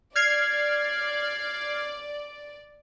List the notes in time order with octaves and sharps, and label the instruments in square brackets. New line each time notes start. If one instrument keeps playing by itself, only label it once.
[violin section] D5 [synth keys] F6 G#6 C7